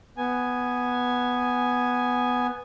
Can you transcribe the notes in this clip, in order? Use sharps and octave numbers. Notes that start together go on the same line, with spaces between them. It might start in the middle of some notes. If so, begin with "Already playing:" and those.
B3 G#5